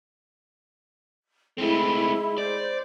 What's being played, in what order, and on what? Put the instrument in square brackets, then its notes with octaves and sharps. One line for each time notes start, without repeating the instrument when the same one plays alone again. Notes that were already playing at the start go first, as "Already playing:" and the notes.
[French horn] G#3 [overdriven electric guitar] A3 C4 [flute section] E4
[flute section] C5 [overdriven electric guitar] D5